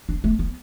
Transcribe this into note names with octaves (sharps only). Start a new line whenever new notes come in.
D4
A3
B3